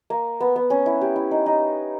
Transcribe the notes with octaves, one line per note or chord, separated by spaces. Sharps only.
A#3
B3
B3
C#4
E4
G4
E4
D#4
D#4